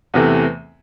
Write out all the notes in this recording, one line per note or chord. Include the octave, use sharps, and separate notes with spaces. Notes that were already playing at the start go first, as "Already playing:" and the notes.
E2 C3 E3 A3